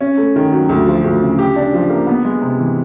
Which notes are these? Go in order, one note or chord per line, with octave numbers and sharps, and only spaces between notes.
C#4
A3
D#3
F#3
D2
F3
D2
C#3
G4
D4
F3
A#3
B3
G#3
C3
E3